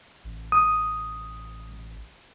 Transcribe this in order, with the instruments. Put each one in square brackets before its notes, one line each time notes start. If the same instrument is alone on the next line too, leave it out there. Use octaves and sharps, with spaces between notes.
[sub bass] A1
[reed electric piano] D#6